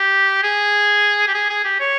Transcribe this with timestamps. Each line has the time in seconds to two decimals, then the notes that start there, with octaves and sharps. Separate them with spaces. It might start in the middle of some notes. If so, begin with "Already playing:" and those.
Already playing: G4
0.43 G#4
1.28 G4
1.35 G#4
1.49 G#4
1.65 G4
1.80 C#5